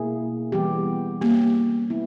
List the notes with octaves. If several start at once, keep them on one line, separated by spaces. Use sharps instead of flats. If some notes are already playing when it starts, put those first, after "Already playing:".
Already playing: B2 A#3 E4 G#4
E3 G3 B3 G4
G3 A#3 C#4 G4
B3 E4